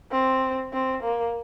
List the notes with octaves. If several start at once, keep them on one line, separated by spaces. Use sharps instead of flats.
C4
C4
A#3